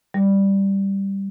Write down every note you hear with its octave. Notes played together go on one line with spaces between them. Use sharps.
G3